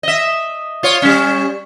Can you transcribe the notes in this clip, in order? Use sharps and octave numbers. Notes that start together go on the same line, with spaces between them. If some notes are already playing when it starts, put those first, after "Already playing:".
D#5 E5
F4 C#5
G3 C#4